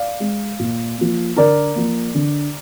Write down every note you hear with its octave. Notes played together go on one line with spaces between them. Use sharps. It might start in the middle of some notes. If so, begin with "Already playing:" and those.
Already playing: D5 F5
G#3
A#2
F3 A#3
D3 A#4 D5
F3 A#3
D3